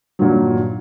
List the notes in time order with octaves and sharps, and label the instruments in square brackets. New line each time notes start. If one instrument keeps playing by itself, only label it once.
[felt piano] G2 A#2 D#3 F#3